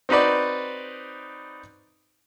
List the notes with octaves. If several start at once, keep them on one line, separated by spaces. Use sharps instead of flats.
C4 D#4 F#4 B4 D5